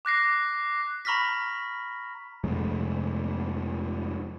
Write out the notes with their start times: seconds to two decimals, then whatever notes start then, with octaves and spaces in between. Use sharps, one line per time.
0.05 D6 F#6 A#6 C7
1.05 A#5 B5 C#6 F6 A#6 B6
2.44 F2 C3 G#3 A3